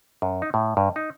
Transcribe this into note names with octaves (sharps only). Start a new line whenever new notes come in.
F#2
D#4
A2
G2
D#4